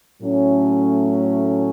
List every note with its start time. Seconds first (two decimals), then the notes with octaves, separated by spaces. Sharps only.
0.20 A2 F#3 A3 C#4